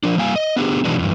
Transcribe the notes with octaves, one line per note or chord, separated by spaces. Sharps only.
F3 D4
G3 A#3 F5 G#5
D#5
B3 D4 G4 G#4
B2 D#3 E3 F#3 G#3 D4
E2 G2